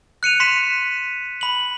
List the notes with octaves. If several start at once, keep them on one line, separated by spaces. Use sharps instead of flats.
F#6 C#7 D#7 F7
C6 B6 C#7 E7
B5 F#7